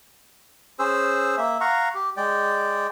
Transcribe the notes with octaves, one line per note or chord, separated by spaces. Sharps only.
C#4 G#4 C5 E6
A#3 E5
F5 F#5 A#5 C#6
G4
G#3 D5 G5